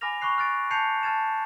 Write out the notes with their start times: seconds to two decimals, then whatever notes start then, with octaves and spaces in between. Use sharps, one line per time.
0.01 G#5 B5 D6 F6 A#6 F7
0.21 B5 C#6 D6 F#6 C7
0.38 F6 F#6 A6 D7
0.71 A5 G6 C7 C#7 F7
1.03 A5 F6 G#6 A6 E7